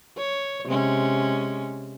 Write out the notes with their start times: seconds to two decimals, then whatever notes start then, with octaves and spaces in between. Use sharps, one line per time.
0.17 C#5
0.66 C3 G#3 C#4